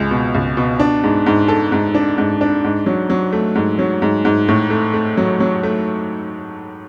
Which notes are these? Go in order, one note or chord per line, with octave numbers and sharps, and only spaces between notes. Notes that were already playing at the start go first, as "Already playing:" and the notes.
Already playing: C#2 G#3
B2
C#2
B2
D4
G#2
G#2
A4
G#2
D4
G#2
D4
G#2
F#3
F#3
A3
G#2
F#3
G#2
G#2
A2
A3
A3
F#3
F#3
A3